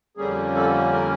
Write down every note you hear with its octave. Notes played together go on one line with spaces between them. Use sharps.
F2 D3 G3 A#3 C#4 G#4
A4
A#4